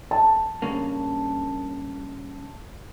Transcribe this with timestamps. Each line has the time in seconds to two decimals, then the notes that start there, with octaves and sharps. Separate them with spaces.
0.11 A5
0.62 G2 C#3 A#3